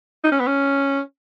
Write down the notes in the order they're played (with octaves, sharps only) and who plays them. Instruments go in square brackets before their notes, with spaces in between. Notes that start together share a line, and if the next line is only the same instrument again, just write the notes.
[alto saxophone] D#4
C#4
B3
C#4